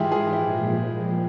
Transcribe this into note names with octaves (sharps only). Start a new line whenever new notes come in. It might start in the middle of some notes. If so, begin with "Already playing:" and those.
Already playing: G#2 E3 G#3 E4 F4 G4 G#4
F4 G#4
A#2 F3 G#3 E4 G4